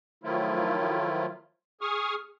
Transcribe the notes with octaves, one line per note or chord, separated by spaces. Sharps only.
D#3 F3 F#3 A3 E4 F4
G#4 C#6 D#6 F6